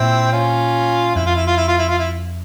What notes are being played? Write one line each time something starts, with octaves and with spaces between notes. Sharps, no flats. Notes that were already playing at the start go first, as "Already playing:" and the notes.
Already playing: A#2 C4 E4
C#4 F4
F2 E4
F4
E4
F4
E4
F4
E4
F4
E4